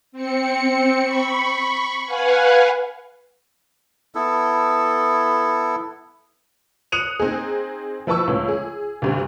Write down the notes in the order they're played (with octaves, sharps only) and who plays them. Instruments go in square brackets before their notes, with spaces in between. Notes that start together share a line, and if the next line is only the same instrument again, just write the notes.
[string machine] C4 C#7
B5 C#6
B4 F5 F#5 G#5
[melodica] B3 E4 A4
[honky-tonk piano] D#6 F#6 C#7 D#7 F7
C4 D#4 G#4
F3 E4 B4 A5 C#6 E6
C#2 A2
G#4
D2 G2 C3